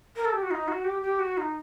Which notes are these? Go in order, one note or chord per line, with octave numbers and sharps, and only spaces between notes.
A#4
A4
G4
F#4
D#4
F#4
G4
G4
F#4
D#4